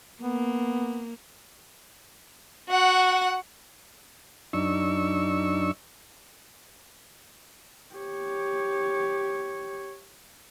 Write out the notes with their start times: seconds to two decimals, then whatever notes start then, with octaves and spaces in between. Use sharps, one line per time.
0.22 A#3 B3
2.69 F#4 F#5
4.53 F#2 D4 D#4 C#6 E6
7.95 G4 C#5